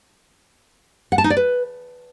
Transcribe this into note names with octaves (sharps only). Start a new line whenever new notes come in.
F#5
A5
D#4
D5
B4